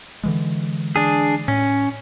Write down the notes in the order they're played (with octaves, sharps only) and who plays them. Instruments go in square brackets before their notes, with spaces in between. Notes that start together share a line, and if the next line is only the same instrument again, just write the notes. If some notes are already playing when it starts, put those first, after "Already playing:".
[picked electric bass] D3 E3 G#3
[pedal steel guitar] D4 G#4
[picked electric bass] A2 [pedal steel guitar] C#4